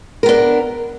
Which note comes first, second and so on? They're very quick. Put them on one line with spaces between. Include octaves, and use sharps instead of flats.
A#4 B3 D4